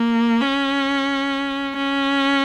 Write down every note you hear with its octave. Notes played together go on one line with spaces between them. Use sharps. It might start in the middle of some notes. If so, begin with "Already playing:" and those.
Already playing: A#3
C#4
C#4